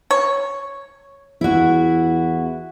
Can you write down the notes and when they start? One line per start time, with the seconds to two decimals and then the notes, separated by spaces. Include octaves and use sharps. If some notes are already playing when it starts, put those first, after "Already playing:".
0.11 C#5
1.41 E2 E4 F#4